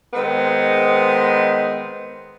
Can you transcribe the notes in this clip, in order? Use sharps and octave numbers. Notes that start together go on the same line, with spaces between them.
D#3 G#3 B3 C4